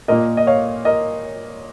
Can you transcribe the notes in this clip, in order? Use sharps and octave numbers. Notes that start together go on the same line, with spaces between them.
A#2 A#3 A#4 D#5
D#5
C#5 F5
A#4 D#5